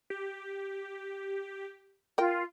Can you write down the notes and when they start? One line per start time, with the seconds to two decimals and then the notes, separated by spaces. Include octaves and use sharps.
0.10 G4
2.18 F4 A#4 G5